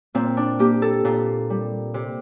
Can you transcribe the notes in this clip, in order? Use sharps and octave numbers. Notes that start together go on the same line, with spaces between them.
A#2 C4
D4
A#3 G4
A4
A#2
G3
C3